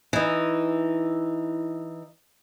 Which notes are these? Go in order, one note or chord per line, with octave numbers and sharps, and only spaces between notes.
E3 D#4